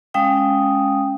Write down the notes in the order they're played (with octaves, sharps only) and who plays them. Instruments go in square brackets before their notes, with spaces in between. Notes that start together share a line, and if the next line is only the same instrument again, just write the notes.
[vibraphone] G#3 C#4 F5 G5 D#6